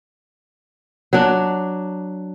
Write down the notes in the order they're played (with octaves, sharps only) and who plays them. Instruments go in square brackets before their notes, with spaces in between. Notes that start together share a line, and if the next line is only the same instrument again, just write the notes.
[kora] F#3 D4